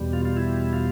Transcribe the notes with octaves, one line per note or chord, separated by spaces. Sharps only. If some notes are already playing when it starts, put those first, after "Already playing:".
Already playing: E2 B2 G3
F4
F4
E4
F4